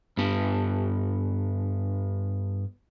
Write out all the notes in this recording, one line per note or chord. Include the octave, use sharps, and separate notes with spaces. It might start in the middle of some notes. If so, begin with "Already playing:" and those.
G2 B3